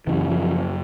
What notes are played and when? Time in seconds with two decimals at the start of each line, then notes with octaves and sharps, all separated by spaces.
0.07 F#2 C#3 E3
0.30 F3